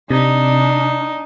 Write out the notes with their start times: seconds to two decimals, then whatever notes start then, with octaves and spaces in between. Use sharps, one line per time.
0.11 C3 D4 D#4